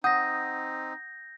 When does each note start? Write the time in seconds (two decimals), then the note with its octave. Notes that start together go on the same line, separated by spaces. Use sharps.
0.04 C4 D#4 F#5 D#6 G6 A#6